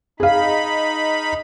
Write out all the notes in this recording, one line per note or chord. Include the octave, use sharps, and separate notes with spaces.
D#4 G#4 F5 B5